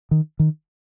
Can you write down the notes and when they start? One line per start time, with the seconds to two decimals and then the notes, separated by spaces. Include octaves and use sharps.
0.11 D#3
0.39 D#3